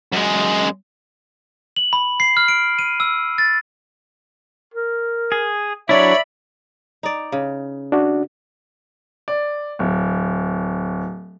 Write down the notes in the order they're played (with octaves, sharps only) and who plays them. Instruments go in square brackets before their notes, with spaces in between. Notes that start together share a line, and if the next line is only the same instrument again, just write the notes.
[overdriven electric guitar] F#2 G#3
[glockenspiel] F#7
B5
C7
F6
D7
D#7
E6
A6
[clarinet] A#4
[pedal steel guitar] G#4
[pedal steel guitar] F#3 D4 E4 [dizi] C#5 [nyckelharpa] D5 B5 [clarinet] E5
[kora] D#4 D5
C#3
[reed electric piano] D4 F#4
[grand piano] D5
D1